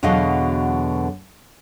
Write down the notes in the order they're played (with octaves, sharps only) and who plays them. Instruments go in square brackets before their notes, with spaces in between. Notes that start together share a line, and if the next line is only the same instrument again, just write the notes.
[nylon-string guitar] E2 B2 D3 F#3 D#5 F5